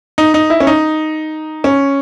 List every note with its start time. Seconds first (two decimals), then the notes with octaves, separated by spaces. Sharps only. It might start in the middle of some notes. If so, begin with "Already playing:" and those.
0.18 D#4
0.34 D#4
0.50 E4
0.60 C#4
0.67 D#4
1.64 C#4